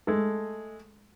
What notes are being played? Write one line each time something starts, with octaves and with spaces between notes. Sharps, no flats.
G#3 A3 A4